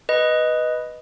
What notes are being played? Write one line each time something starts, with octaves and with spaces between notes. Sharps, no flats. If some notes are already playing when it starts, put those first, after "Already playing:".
B4 D#5